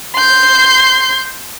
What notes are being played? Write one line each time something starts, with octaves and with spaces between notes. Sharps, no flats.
C6 G6